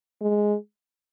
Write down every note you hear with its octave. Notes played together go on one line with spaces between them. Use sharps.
G#3